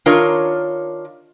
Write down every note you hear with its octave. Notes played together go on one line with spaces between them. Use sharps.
D#3 D4 F4 A#4 C#5